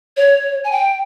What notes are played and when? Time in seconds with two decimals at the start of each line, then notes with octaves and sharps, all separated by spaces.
0.17 C#5
0.64 G#5
0.72 G5